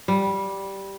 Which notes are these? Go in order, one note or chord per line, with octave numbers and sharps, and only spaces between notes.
G3